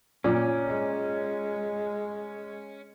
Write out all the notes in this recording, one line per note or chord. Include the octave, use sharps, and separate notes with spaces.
A#2 C#4 D5 D6
G#3